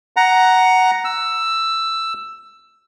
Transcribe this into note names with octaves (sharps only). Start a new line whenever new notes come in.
F#5 A#5
E6